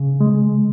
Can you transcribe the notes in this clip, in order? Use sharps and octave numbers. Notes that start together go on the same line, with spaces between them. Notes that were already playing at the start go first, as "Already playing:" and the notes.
Already playing: C#3
G#3